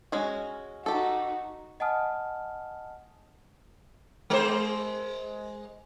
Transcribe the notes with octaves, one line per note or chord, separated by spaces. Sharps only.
G#3 C#4 F#4
D#4 F#4 G4 A4
D#5 F#5 G#5 A5 D#6 F6
G#3 C5